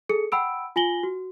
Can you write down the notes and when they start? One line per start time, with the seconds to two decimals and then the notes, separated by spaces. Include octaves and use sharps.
0.09 G#4 A4 C#7
0.32 F#5 G5 B5 E6 D7
0.76 F4 G#5 A#6 F#7 G7
1.03 F#4